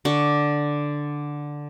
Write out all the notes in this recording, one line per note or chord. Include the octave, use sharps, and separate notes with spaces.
D3 C#6